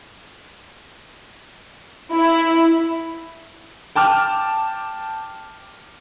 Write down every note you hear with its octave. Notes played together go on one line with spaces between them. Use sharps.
E4
G5 A5 D6 F6